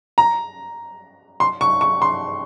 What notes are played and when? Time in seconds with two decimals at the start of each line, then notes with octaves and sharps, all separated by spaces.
0.18 A#5
1.40 C6
1.61 C#6
1.81 C#6
2.02 C6